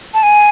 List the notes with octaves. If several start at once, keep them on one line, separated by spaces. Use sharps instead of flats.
A5
G#5